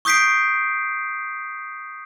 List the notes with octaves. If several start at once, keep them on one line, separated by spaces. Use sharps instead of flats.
C#6 D#6 G6 B6 C7 D7